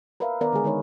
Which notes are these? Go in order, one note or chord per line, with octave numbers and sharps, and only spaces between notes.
A#4 B4 D5 E5 F5
D#3 B3 A#4 D5
D3 G#3 G#4
D#3 G#3 D#4 B4 C#5